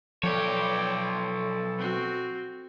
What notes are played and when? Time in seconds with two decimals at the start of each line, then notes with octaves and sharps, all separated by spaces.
0.23 B1 F3 A4 C#5 D5 G5
1.78 C4 F#4